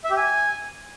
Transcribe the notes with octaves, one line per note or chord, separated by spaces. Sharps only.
E5
G4
G#5